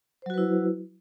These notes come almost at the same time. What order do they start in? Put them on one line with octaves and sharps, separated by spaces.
C5 F#3 F#4 B4 E4